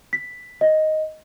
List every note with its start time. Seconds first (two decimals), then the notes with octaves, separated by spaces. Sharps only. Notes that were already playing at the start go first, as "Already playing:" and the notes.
0.13 B6
0.61 D#5